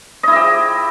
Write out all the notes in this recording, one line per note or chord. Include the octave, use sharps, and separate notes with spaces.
E4 G4 D#5 E5